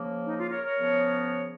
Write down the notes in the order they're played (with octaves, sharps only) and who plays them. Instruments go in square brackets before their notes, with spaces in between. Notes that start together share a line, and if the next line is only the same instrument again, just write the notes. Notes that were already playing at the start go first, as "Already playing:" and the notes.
Already playing: [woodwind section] C#3 F3 A#3
D#4
F4
A#4 C#5
A#4 C#5
C#3 F3 B3